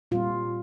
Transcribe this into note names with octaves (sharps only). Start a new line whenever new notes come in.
A#2 G3 C4 F4